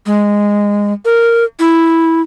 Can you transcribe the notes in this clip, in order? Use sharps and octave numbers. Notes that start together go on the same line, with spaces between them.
G#3
A#4
E4